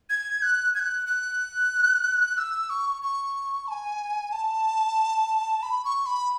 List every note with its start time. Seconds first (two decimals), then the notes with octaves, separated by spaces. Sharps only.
0.09 G#6
0.42 F#6
0.75 G#6
0.79 F#6
1.07 F#6
2.37 E6
2.70 C#6
3.02 C#6
3.67 A5
3.71 G#5
4.32 A5
5.63 B5
5.85 C#6
6.06 B5